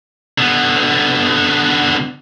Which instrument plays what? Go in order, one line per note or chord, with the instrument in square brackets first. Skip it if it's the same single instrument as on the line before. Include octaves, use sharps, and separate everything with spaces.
[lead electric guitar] D3 B3